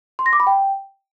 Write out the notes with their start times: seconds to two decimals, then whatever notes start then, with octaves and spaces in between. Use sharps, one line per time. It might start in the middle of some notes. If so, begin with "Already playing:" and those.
0.19 C6
0.26 A#6
0.33 D6
0.40 B5
0.47 G5